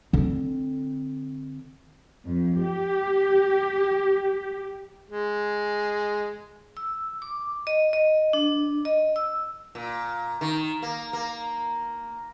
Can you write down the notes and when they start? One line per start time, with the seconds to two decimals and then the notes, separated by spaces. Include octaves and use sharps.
0.13 D3 C4
2.27 F2
2.64 G4
5.10 G#3
6.77 E6
7.22 D6
7.67 D#5
7.93 D#5
8.33 D4
8.85 D#5
9.16 E6
9.75 A#2
10.41 D#3
10.82 A#3
11.13 A#3